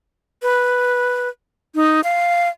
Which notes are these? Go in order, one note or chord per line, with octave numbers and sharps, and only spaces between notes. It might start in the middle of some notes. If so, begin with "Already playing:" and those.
B4
D#4
F5